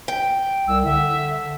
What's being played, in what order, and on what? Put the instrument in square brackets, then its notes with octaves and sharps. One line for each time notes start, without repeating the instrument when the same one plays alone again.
[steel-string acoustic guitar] G5
[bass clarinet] C2 [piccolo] E6
[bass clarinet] D3 [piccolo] E5